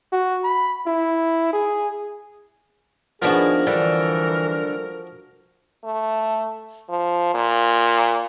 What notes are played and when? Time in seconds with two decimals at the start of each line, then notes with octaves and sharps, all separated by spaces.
0.12 F#4
0.44 B5
0.86 E4
1.53 G#4
3.22 D#2 F3 B3 D4 F#4 G#4 A#4
3.67 D3 E3 G3
5.84 A3
6.89 F3
7.34 A#2